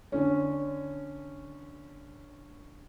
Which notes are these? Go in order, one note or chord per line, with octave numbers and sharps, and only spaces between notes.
D3 C#4